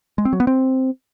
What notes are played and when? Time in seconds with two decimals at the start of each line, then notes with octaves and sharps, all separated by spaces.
0.18 G#3
0.25 C4
0.33 F#3
0.40 B3
0.47 C4